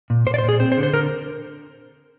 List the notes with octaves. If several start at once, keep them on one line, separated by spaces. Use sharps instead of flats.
A#2
A#2 C5
D5
C5
A#2
G#4
C4 C5
C5
D3
C5
D3 A#4